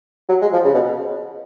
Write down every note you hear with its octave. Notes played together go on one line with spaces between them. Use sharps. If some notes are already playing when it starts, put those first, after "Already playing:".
F#3
G#3
F3
C#3
B2